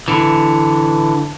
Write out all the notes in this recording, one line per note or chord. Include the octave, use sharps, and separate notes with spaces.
D3 E3